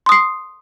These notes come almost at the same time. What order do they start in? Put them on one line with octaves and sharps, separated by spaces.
C6 D#6 C7